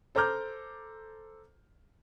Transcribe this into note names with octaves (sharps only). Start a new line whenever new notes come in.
A4 C5 A#5 D6 F6 G6